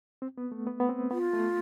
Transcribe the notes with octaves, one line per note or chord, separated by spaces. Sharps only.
C4
B3
A3
B3
B3
C4
B3 F4
A3